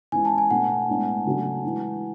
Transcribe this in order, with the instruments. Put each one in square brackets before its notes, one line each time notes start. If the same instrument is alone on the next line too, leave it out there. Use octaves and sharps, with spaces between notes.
[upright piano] E3 G#3 C#4 E4 [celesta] G#5
[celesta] A5
G#5
[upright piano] B2 A3 D4 [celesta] F#5
[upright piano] A2 G#3 B3 D4
C#3 F#3 A3 D4
E3 G#3 D4